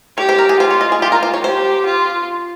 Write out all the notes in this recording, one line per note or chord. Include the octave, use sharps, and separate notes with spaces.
G4 C#5
C5
A#4
G#4
F4 C5
C#5
D#5
G#4
F4 G4
A#4
C5
C#5
G4 C5
F4